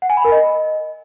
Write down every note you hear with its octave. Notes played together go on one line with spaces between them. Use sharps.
F#5
G#5
B5
A#4
D#5